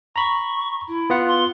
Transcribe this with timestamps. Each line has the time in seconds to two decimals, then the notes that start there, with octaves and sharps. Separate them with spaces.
0.16 A#5 B5 C#6
0.88 E4
1.10 B3 F4 F#5
1.27 C6